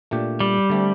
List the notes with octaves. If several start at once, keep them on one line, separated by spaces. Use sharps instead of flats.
A#2 A3 D4 G4
G3
D3 A3 C4